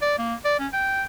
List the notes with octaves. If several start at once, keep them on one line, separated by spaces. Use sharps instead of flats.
D5
A#3
D5
C#4
G5